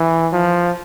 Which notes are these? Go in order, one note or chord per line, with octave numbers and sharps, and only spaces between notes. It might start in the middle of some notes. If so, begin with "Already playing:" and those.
Already playing: E3
F3